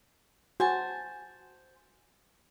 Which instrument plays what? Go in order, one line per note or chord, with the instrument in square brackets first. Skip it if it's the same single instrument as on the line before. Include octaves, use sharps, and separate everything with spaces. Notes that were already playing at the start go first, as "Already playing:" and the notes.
[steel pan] F#4 [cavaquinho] C5 G#5 A5